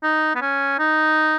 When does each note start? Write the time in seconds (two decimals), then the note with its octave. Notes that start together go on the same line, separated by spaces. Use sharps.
0.03 D#4
0.35 B3
0.41 C#4
0.79 D#4